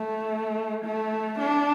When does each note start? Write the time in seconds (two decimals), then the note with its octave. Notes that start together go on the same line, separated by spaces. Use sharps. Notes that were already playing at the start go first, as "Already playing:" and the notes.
Already playing: A3
0.84 A3
1.38 D4